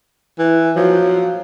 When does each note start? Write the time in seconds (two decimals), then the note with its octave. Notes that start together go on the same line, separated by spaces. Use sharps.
0.39 E3
0.76 F3 F#3